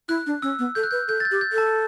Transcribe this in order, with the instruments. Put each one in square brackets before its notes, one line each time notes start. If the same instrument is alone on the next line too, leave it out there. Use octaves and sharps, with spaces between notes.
[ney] E4 [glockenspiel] F#6
[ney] D4
[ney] C#4 [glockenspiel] E6
[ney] B3
[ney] A4 [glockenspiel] G6
[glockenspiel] F#6
[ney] B4 [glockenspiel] G6
[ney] A4 [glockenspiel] G6
[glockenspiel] A6
G6
[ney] G4
[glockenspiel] G6
[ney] A4
[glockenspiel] A5